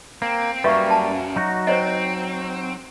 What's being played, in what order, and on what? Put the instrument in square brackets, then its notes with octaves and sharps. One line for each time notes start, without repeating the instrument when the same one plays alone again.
[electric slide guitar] A#3 [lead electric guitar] C4
[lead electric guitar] F#2 [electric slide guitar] G3 A#3 [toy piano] B4 E5 C#6
[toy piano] A5
[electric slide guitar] F#3 D#4 F#4
[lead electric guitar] C4 [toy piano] C5 C#5 D#5